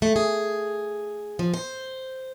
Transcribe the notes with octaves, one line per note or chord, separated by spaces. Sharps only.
A3
G#4
F3
C5